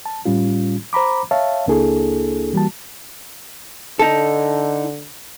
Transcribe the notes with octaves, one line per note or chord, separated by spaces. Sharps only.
A5
A2 G3 C#4 F4
C5 A#5 B5 D6
C#5 E5 F5 A5
C#2 A#3 D4 E4 G#4 A4
E3 G3 A#3 F#4 A5
D3 D#4 A4